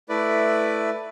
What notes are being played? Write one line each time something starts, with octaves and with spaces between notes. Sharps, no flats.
A3 E4 B4 D5